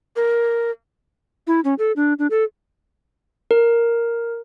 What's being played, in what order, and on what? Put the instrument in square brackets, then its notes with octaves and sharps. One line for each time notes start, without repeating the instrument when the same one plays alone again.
[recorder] A#4
E4
C#4
A4
D4
D4
A4
[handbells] A#4